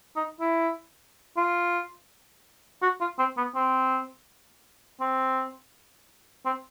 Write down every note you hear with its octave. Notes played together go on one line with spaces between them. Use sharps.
D#4
E4
F4
F#4
F4
C4
B3
C4
C4
C4